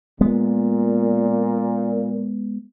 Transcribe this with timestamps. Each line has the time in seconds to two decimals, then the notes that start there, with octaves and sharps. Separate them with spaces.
0.21 A#2 G#3 B3